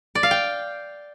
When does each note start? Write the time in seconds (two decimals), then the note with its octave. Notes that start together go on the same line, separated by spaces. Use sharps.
0.15 D5
0.23 F5
0.31 G5